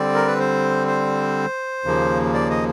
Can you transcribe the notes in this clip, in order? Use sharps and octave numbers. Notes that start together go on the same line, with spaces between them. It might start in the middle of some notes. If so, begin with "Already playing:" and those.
Already playing: D3 G3 C4 D5
A#4
B4
C5
C5
D#2 C#3 F3 A#3
D5
D#5